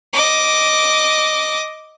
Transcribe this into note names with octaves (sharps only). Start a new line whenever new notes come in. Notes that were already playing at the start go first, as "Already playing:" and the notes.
D#5 D6